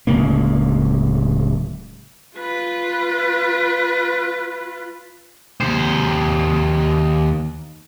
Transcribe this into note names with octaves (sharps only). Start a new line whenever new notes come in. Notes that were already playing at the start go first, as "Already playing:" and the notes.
D1 C#2 A2 A#3
F4 B4
D#2 C5